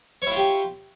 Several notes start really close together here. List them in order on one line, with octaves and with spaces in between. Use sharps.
C#5 E4 F4 G4